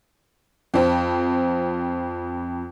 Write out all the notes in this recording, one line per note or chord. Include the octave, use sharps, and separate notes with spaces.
F2 C4